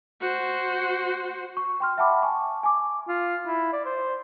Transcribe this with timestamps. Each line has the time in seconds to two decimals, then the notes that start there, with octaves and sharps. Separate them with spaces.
0.21 F#4 C5
1.57 C#6
1.80 G5 C6 F6
1.98 E5 F#5 G5 A5 B5 D6
2.23 G#5 A5 C#6
2.63 G#5 D6
3.08 F4
3.47 E4
3.73 D5
3.85 C5